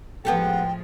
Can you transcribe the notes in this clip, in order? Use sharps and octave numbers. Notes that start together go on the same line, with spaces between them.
A2 F3 G#3 B3 G4 A4 G5